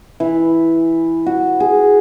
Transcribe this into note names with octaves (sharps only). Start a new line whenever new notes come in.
E3
F#4
G#4